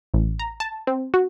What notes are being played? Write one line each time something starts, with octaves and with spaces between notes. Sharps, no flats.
A1
A#5
A5
C4
F#4